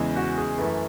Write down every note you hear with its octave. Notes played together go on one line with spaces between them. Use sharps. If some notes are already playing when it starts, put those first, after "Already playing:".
Already playing: E2 C#3 E3 G#3
F#4
G#4
F#2 E3 A3 B4